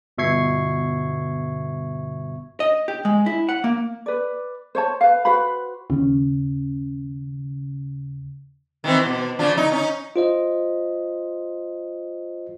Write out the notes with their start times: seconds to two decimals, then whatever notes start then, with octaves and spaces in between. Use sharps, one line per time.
0.18 G1 B2 E5 C#6 G#6 C7
2.60 D#5
2.88 G4
3.05 G#3
3.26 E4
3.49 F#5
3.64 A#3
4.06 B4 D5
4.75 C5 C#5 A5
5.01 B4 F5
5.25 F#4 B4 C5 B5
5.90 D#2 C#3
8.84 D#3 E3 C4
9.05 B2
9.39 C#3 F3 D4
9.57 D#4
9.72 C#4 D#4
10.16 F4 C5 D#5